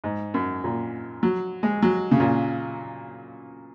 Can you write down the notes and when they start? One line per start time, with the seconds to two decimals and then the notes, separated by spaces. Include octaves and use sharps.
0.04 G#2
0.34 F#2
0.64 A#2
1.23 F#3
1.63 G#3
1.82 F#3
2.11 C#3
2.20 A#2